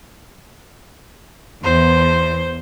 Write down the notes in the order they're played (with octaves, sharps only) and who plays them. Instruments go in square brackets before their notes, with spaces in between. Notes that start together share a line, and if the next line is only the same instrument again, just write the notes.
[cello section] E2 [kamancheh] C5